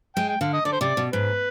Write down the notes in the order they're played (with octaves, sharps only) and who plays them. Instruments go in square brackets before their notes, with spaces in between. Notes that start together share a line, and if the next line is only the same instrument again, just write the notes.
[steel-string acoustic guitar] G#3 [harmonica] G5
[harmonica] G5
[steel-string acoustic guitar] D3 [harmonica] F5
[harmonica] D#5
[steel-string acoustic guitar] D3 [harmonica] D5
[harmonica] C5
[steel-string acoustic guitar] C3 [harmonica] D5
[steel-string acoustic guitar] B2
[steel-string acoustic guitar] G#2 [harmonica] B4